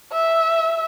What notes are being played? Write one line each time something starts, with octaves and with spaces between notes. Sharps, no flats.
E5